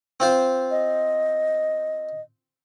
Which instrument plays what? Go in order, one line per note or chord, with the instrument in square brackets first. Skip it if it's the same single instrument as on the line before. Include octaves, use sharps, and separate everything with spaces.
[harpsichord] C4 F4 C5
[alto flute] D#5